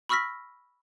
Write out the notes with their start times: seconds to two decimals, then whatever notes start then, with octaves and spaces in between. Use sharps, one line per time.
0.09 B5 C#6 E6 F6 A#6 B6